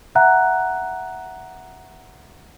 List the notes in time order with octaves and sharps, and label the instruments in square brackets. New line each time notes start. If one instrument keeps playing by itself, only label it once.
[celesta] E5 F#5 A#5 F#6